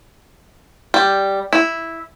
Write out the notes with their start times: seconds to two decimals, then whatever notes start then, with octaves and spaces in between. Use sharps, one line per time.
0.94 G3
1.53 E4